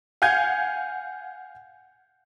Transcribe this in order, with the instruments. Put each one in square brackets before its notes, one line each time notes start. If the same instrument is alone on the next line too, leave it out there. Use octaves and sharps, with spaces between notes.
[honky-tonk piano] F5 F#5 G#5 G6 G#6